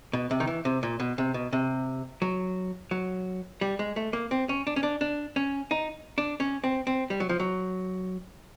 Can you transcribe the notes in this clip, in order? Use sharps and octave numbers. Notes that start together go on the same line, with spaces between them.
B2
C3
D#3
E3
C3
A#2
B2
C3
B2
C3
F#3
F#3
G3
G#3
A3
A#3
C4
C#4
D4
C#4
D4
D4
C#4
D#4
D4
C#4
C4
C4
G3
F#3
F3
F#3